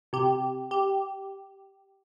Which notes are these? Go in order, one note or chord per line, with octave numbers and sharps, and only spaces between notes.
C3 G4
G4